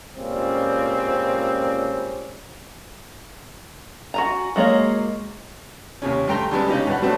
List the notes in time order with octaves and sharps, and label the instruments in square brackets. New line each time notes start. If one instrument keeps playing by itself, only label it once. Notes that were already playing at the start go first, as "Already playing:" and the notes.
[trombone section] C#2 A#2 G3 C4 C#4
[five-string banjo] F#4 G#5 A#5
F#3 G#3 A#3 C#5
[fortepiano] D#2 C3 C#4
G2 A3 G5 A#5 C6
D3 G3 G#3 B3
C#3 D#4 G4
G2 D4 B4 F#5
F#3 A3 B3 C4 D4